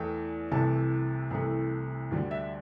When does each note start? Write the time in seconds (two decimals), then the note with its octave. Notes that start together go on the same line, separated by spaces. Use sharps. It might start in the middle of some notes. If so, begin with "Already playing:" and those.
Already playing: E2 E3 A3 G5
0.51 C2 C3 E3 A3 A5
1.31 C2 C3 E3 A3
2.11 D2 D3 G3
2.31 E5